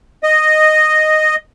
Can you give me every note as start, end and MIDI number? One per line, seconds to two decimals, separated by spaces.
0.23 1.36 75